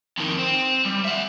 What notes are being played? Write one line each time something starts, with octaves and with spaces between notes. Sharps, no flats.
F2 D#3
C4
G3
E5 F#5